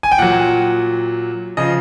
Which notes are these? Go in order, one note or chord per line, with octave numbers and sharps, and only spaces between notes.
G#5
G5
A#2 F#3 F#5
C#3 F3 D#5